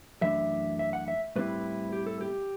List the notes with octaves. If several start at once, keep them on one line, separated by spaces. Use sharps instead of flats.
F#2 E3 A3 D4 E5
E5
F#5
E5
A2 G3 C4 E4 B4
G4
A4
G4